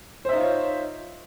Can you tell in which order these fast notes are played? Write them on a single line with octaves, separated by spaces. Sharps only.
C5 E5 D#4 F4 C#5